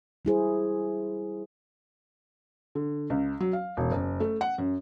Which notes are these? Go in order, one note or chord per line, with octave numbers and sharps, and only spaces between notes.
G3 E4 G#4 C5
D3
C#2
F#3
F5
E1
F#1
A3
F#5
F#2